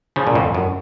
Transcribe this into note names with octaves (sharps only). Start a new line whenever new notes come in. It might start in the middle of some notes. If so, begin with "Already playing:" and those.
C#3 F3
A#2
F2 A2
F#2